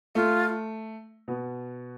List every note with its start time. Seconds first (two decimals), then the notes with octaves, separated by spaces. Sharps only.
0.15 A3 F4
1.28 B2 B3